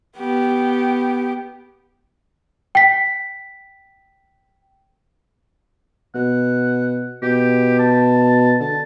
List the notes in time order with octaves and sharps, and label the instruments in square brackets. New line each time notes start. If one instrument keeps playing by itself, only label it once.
[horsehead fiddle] B3 G4
[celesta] G5 B6
[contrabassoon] B2 [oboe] F#5
[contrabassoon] B2 [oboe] G4
[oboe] A5
[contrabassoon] D3 [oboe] A5